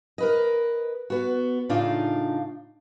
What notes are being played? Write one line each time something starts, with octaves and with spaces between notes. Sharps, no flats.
A#4 B4 D#5
B3 F#4
A2 C#3 D4 D#4 F4 F5